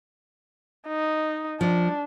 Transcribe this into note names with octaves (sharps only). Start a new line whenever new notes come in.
D#4
F3 D4